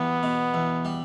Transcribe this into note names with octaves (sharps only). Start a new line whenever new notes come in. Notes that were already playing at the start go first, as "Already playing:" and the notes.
Already playing: E2 G3 B3
B2
E2
G3